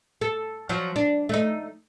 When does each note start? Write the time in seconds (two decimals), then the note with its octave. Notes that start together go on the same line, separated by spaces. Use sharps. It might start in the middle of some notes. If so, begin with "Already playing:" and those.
0.21 A4
0.69 F3 F#3
0.96 D4
1.29 A3 D#4